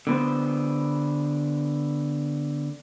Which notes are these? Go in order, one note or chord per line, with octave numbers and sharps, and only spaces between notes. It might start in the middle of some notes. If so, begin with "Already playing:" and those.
D3 B3 C5